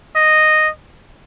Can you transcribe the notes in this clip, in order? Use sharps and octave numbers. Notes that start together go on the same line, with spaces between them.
D#5